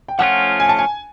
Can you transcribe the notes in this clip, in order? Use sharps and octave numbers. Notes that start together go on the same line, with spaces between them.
G5
F3 A3 C#4 F4 F#5
G#5
A5
G#5